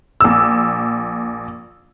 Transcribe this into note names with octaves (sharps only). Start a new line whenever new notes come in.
A#1 E6